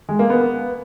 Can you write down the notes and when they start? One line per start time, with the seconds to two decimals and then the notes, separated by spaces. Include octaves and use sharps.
0.09 G#3
0.19 A#3
0.30 B3